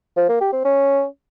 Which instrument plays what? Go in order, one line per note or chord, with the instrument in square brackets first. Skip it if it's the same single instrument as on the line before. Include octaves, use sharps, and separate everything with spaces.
[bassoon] F3
A#3
G4
C4
C#4